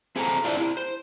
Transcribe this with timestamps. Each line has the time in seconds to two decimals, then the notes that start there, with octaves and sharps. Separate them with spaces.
0.16 C4 G#4 A4 C5 G5 A#5
0.44 D4 E4 F4 C5 D5 E5
0.57 C4 E4
0.77 C5